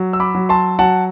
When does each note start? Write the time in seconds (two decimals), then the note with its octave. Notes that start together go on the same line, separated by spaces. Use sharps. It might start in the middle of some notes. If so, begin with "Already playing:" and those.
Already playing: F#3
0.13 E6
0.20 B5 D6
0.35 F#3
0.49 A5 C6
0.79 F#3 F#5 A5